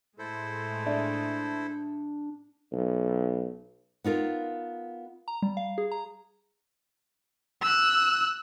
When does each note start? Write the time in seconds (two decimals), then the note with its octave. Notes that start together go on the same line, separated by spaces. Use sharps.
0.19 A2 G#3 A3 E4 A4 C5
0.86 D4 D5 E5
2.72 B1
4.04 B3 D#4 F4 A#4
5.28 A#5
5.42 G3
5.57 F5
5.78 G#4
5.92 A#5
7.62 E6 F#6